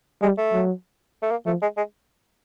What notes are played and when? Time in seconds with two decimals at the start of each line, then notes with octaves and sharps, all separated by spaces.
0.22 G3 G#3
0.37 A3
0.53 F#3
1.22 A3
1.31 A#3
1.46 F3 A3
1.62 G#3
1.77 G#3